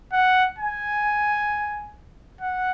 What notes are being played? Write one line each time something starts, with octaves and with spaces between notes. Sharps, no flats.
F#5
G#5
F#5